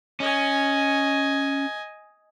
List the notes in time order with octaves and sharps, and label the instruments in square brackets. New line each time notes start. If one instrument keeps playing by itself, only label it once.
[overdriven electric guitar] C#4 [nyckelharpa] D#5 G#5